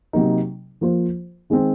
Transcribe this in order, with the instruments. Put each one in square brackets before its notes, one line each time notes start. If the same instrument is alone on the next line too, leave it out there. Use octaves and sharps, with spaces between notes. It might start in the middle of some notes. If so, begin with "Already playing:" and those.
[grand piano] C3 F#3 A#3 D#4
F3 A#3 F4 C5
D#3 G#3 C4